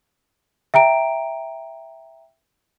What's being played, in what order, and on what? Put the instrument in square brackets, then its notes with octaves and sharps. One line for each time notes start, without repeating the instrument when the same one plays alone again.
[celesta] E5 G5 A#5 D7